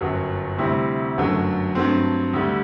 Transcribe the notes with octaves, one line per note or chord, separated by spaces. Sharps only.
G1 F#2 F#3
D2 C3 G3 C4 E4
G1 F#2 D3 F#3 A3
G2 F#3 A3 C4
D2 D3 G3